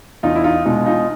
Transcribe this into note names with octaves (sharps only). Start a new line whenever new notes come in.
E2 D#4 F4
E4
D#4 F4
B2 G#3 D#4 F4
D#4 F4